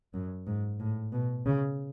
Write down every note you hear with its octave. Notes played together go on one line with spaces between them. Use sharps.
F#2
G#2
A2
B2
C#3